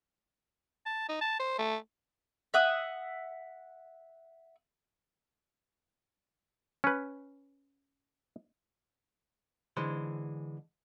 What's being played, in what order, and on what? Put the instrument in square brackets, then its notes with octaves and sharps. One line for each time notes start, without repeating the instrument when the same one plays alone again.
[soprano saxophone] A5
D#4
A5
C5
A3
[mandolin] E5 F#5 D#6
[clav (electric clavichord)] C#4 B4
[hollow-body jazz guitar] D3 E3 G#3 C5